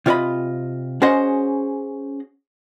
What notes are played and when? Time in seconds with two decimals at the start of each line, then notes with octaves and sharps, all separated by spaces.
0.06 C3 F4 C#5 D#5 B5
1.02 C#4 F#4 G#4 C5 D#5 F#5